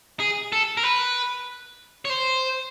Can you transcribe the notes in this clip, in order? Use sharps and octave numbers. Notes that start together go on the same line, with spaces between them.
G#4
A4
A#4
B4
C#5
C5